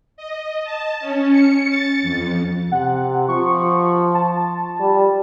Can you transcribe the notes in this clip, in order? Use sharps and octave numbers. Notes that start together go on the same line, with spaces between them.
D#5
A5
C#4
C#7
A6
F2
C3 F#5
F3 C#6
A5
G3